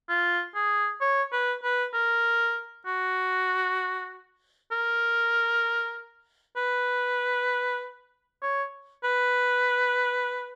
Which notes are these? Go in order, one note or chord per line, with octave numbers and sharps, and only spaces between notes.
F4
G#4
C#5
B4
B4
A#4
F#4
A#4
B4
C#5
B4